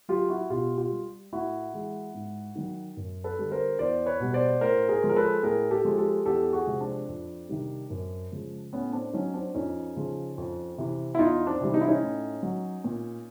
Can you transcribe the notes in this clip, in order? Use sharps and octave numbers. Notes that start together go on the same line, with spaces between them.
F#3 F4 G4
E4 F#4
B2 F4 G4
F4 G4
G3
A2 E4 F#4
E3 G#3
G#2
D#3 F#3
F#2
A4 B4
D3 G3
A#4 C5
E2 C5 D5
B4 C#5
B2 G3
C5 D5
A2 A#4 C5
G#4 A#4
F3 G#3
A#4
A4 B4
A2 G#4 A#4
G4 A4
F3 G#3
G4 A4
E2 G4 A4
F#4 G#4
C3 F3 G#3
C4 D4
F2
C3 D#3 G3
F#2
C#3 F3 G#3
A2 B3 C#4
C4 D4
F#3 C#4 D#4
C4 D4
F2 C#4 D#4
C#3 F3
F2
C3 E3
E4
E2 D#4 F4
C4 D4
C3 E3 G3
D#4
E4
C#4 D#4
A2
F#3
A#2